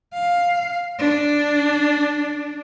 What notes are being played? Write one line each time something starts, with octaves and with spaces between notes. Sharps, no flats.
F5
D4